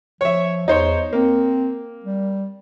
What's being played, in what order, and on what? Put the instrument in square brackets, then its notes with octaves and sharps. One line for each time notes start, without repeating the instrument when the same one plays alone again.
[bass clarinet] F3 [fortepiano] C#5 E5
[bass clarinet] E2 [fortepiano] D#4 C5 C#5
[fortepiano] A#3 [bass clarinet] C4
[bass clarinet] G3